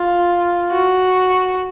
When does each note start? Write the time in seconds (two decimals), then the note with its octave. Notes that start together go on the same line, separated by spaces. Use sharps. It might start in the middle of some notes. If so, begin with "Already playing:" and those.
Already playing: F4
0.71 F#4